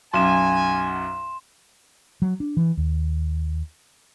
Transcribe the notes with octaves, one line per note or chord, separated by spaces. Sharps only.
B1 F#2 G#5 C6 E7
F#3
D4
E3
D#2